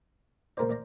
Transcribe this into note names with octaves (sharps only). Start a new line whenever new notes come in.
C#2 A#2 A#4 C5 D5
A1 D5 A#5